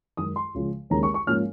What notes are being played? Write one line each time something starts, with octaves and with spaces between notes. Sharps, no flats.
F#2 D#3 G#3 D#6
C6
C#2 C#3 F3
D#2 D#3 G#3 C#4 A#5
C#6
C#6
G#2 F3 A#3 C#4 F6